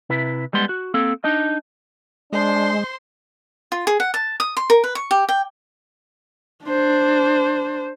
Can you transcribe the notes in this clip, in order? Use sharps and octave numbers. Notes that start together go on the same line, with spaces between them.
C3 E4 B4
G3 G#3 B3 C6
F#4
A#3 C4 A4
D4 D#4 D#5
G#3 D4 C5 C6
F4
G#4
F#5
A5
D#6
C6
A#4
B4
C#6
G4
G5
D4 C5